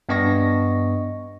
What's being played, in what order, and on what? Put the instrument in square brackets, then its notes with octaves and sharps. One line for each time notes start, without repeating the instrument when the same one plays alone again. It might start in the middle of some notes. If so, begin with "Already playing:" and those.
[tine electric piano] G2 B3 D4 D#5 C#6 A#6